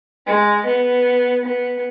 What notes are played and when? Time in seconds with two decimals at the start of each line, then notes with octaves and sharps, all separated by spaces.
0.26 G#3
0.65 B3
1.45 B3